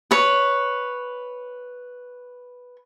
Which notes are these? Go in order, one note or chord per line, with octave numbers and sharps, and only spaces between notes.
B4 C#5